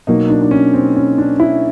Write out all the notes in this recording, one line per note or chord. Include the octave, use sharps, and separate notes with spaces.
B2 F#3 A#3 D#4
D4
D4
C#4
C4
C#4
D4
E4